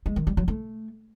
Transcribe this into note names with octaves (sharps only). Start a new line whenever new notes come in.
G#3
D#3
G3
F#3
A3